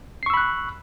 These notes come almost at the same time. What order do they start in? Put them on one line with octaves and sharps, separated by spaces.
C7 C#6 E6 B5 F#6